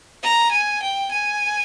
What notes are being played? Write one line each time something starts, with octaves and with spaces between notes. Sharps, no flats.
A#5
G#5
G5
G#5